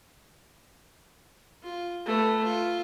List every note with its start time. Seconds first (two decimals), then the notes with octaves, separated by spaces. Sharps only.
1.63 F4
2.06 A3 B4
2.43 F4